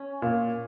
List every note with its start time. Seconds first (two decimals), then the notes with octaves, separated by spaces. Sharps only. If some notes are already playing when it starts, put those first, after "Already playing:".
Already playing: C#4
0.22 A#2